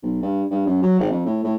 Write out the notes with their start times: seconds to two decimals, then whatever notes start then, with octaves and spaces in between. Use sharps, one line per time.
0.03 B1
0.22 G2
0.51 G2
0.67 F#2
0.82 F#3
0.99 G#1
1.11 F2
1.26 A2
1.44 A2